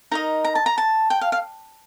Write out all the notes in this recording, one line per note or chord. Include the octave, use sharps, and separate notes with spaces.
D#4 A#4 D#5 A#5
A#5
A5
A#5
A5
G5
F5
F5